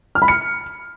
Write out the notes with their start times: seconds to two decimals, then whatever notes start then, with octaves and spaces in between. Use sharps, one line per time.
0.15 F6
0.22 B5
0.28 C#7